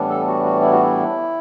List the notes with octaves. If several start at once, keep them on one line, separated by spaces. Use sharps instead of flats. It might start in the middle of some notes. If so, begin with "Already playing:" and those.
Already playing: A2 E3 G3 B3 D4
A4
F#4
F#4
E4
F#4
E4